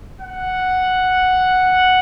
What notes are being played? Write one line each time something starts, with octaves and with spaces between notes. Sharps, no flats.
F#5